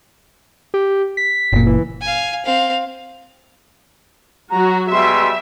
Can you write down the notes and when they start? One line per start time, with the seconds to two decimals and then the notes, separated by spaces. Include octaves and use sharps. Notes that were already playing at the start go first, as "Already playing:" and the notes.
0.74 G4
1.17 B6
1.53 F#1 A#2
1.67 E3
2.01 F5 G#5
2.45 C4 F5
4.50 F#3 F#4 A#5
4.91 B2 G3 G#3 E5 C6